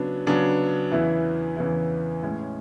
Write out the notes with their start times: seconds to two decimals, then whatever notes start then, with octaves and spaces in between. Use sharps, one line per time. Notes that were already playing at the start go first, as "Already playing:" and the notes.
Already playing: C#3 F#3 B3 D4
0.27 C#3 F#3 B3 D4
0.91 E2 C#3 E3 B3 E4
1.57 E2 C#3 E3 B3 E4
2.23 A2 G#3 C#4